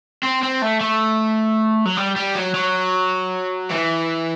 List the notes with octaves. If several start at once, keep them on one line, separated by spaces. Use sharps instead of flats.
C4
C4
A3
A3
F#3
G3
G3
F#3
F#3
E3